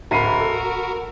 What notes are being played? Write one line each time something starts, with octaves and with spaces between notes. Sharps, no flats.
D1 F#4 A#4 A#5 B5 C7 D#7
A4